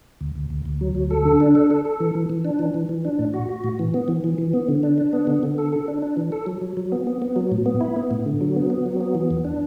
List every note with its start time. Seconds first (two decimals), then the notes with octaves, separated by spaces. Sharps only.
0.21 D2
0.35 D2
0.50 D2
0.65 D2
0.81 F#3
0.95 D2
1.11 A4
1.25 D3
1.40 D4
1.55 A4
1.71 A4
1.85 A4
2.00 E3
2.15 E3
2.30 E3
2.45 D4
2.59 E3
2.74 E3
2.89 E3
3.05 D4
3.19 A2
3.34 F#4
3.49 F#4
3.64 A2
3.79 E3
3.94 B3
4.08 E3
4.24 E3
4.38 E3
4.53 B3
4.69 D3
4.83 D4
4.98 D4
5.13 B3
5.27 D3
5.43 D3
5.58 A4
5.72 A4
5.88 D4
6.02 D4
6.17 E3
6.32 A4
6.46 F#3
6.61 F#3
6.77 F#3
6.92 B3
7.07 B3
7.22 B3
7.36 F#3
7.52 A2
7.66 B3
7.81 E4
7.96 B3
8.11 A2
8.26 D3
8.41 F#3
8.56 B3
8.70 B3
8.86 F#3
9.01 B3
9.15 E3
9.31 E2
9.45 D4